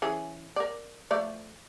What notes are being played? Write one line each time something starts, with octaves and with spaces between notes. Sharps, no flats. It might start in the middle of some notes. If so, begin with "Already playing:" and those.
E3 C#4 G#4
A#4 D5
F3 A3 D5